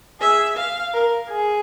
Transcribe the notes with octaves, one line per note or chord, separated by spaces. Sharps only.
G#4 E5
F5
A#4
G#4